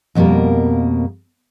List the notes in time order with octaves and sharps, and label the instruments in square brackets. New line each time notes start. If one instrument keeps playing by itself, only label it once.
[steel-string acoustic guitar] F2 B2 G3 A#3 A#4